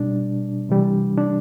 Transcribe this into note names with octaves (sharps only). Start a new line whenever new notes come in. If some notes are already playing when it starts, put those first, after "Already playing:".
Already playing: B2 G3 D4
C3 E3 G3
D4